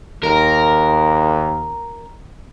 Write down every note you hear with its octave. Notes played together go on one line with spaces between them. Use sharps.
D#2 A#4